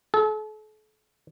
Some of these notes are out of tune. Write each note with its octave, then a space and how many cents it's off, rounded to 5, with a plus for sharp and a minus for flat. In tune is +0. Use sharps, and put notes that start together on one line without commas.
A4 -40